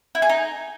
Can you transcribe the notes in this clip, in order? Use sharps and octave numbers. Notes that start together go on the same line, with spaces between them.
E4
G#4
D#4